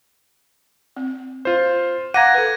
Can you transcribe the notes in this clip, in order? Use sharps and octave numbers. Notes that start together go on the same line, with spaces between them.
C4
F4 C5
F5 F#5 A#5 D6 G#6 A#6 D#7
A4 B4